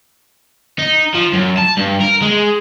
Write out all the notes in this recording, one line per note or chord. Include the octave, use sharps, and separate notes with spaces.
D#4
F3
F#2
A5
G2
A#4
G#3